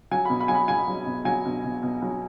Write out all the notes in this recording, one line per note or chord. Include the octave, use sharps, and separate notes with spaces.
F#3 G#5
B2 B5
B5
F#3 G#5
B5
F#3 G#5
F#3
B2
F#3 G#5
B2
B2
B2
F#3